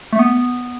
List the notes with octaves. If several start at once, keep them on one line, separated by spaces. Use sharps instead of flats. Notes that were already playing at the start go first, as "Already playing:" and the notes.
A3
B3